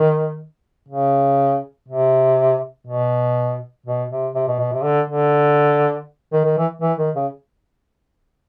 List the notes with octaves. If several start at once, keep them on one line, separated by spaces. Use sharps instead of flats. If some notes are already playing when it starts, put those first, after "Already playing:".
Already playing: D#3
C#3
C3
B2
B2
C3
C3
B2
B2
C3
D3
D3
D#3
D#3
E3
E3
D#3
C#3